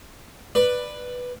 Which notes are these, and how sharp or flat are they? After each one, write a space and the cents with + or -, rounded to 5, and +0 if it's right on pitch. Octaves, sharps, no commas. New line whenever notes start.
B4 +0 D5 +15